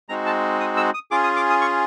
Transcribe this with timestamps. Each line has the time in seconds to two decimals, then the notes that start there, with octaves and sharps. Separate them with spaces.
0.09 G#3 C4 D#4 F#4 A#5
0.26 A5
0.60 D#6
0.77 E6
0.94 D#6
1.11 C#4 F4 G#4 D6
1.24 D#6
1.36 D6
1.50 D#6
1.62 C#6